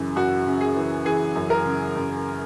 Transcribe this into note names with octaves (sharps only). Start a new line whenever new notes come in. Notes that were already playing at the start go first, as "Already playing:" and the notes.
Already playing: F#2 C#3 E3
F#2 F#4
C#3
G#4
E3
E3 G#4
F#2
A#4
C#3
F#2